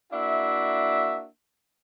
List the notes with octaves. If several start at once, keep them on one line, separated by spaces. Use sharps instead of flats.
A#3 D4 E4 F#4 E5